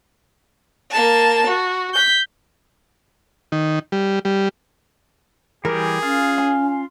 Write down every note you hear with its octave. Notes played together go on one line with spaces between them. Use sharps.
A#3 A5
F#4
G6 B6
D#3
G3
G3
E3 G3 G4 G#4 A#4
C#4 F4 F5
G#5